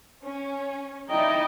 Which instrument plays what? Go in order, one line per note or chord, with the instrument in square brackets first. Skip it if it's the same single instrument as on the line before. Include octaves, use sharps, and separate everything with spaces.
[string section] C#4
[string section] D#4 E4 D5 [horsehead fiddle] D#5 G5